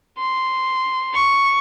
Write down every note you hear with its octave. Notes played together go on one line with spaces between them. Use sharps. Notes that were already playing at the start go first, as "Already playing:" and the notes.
C6
C#6